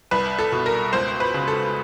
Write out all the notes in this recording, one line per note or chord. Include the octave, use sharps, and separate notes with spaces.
C2 B4
A4
B2
A#4
C#2 C5
B4
C#3
A4